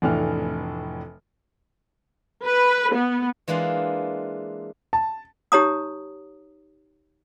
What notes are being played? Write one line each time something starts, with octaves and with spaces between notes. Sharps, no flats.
F1 A2 E3 D4 F6
B4
B3
E3 G#3 A#3 D4 F4
A5
D#4 G4 C#5 A#5 D#6